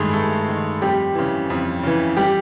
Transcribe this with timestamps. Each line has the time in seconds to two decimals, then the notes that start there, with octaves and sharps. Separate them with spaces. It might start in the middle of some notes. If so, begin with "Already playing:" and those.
Already playing: G2 D#3 G#3 A3 G#4
0.14 G2 A3 A4
0.48 D#3
0.82 F2 G3 G4
1.15 C#3 E3
1.50 F2
1.83 C#3 E3
2.17 G3 G4